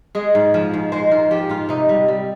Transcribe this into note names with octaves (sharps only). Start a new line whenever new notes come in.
G#3 G#4
G#2
F3
G#2
G#3 C5
G#2 A#4
F3 G4
G#2 F4
C3 D#4
G3
G3